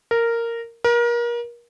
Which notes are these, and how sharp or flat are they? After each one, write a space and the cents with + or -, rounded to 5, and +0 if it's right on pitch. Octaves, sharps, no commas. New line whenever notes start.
A#4 -10
A#4 +30